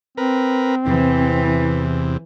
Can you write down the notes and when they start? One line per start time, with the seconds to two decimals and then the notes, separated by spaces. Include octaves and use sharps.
0.18 C4 A#4 B4
0.86 E2 C3 E3